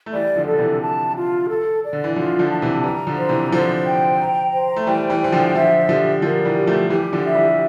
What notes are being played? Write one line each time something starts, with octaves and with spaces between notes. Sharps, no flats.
A3
E3 G3 D5
D3 F3
D3 A4
C3 E3
A5
F4
A4
D5
D3
E3
D3 F3 F4
D3 F3
A5
C3 E3
E3 G3 A#5
D3 F3
C5
C3 E3
D3 F3 C5
G5
A#5
C5
A3
E3 G3 G5
E3 G3
E3 C5
D3 F3
D3 F3 E5
D3 F3 G4
D3 F3 A#4
E3 G3
G4
F3 A3
E3 G3 G4
D3 F3
E5
E3 G3